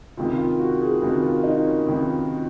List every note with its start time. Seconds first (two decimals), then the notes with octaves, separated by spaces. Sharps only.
0.17 C#2 C3 D#3 F4
0.38 F4
0.59 F#4
0.81 G#4
1.01 C#2 C3 D#3 F#4
1.23 F4
1.43 D#4
1.65 C#4
1.86 C#2 C3 D#3